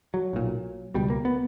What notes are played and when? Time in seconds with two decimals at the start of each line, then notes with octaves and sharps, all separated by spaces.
0.14 F#3
0.33 B1 A#2
0.94 C#2 B2 G3
1.10 A#3
1.25 B3